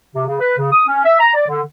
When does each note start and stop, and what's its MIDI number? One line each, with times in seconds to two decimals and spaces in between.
0.15 0.23 48
0.27 0.38 49
0.40 0.56 71
0.58 0.68 49
0.72 0.83 87
0.87 1.01 61
1.05 1.19 76
1.20 1.31 82
1.35 1.47 74
1.48 1.62 50